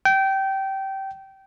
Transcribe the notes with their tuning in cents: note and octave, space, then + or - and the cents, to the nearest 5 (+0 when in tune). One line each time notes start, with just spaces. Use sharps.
G5 -20